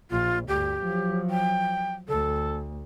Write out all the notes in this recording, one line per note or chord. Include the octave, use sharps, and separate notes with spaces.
A#1 F4
D2 G2 G4
F3 F#3
G5
D2 A4